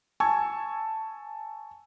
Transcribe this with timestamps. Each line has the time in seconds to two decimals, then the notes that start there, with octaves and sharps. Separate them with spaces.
0.20 G#5 A5 C#6 E6 G#6